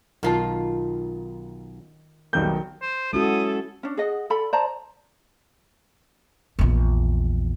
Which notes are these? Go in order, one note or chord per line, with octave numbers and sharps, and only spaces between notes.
B1 D#3 F4 A#4 F5 A5
B1 D#3 G3 A#3 G6
C5
G#3 C#4 E4 F#4 A4 D#6
C#4 D4
G#4 D#5 F#5
A4 D5 B5
C5 D5 A5 A#5
A#1 E2